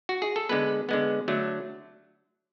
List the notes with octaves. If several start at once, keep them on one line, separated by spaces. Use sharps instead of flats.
F#4
G#4
A4
D3 G#3 B3 B4
D3 G#3 B3
D3 F#3 A3